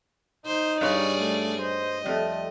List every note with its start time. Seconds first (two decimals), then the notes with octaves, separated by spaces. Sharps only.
0.47 D#4 C5
0.81 G2 G3 G#4 C#5 D5
1.17 A3
1.61 C5 D#5
2.06 F2 G3 A3